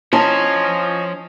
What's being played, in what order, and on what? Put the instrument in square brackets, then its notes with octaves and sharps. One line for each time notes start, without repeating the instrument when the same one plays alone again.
[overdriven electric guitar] F3 C5 [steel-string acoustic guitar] C#4 [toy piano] E4 A5 [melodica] D#5 G#5 C#6